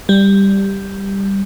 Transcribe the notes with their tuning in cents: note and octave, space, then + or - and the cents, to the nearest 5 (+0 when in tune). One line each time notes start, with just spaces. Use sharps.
G3 +5